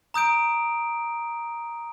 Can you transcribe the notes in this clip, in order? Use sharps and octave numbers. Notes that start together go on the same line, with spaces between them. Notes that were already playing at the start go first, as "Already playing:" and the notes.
A#5 D#6 G6 D7